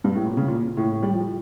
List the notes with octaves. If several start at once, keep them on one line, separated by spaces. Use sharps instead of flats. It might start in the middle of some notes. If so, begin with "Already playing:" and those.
G2
A2
A#2
C#3
A#2
A2
A2
G3
F3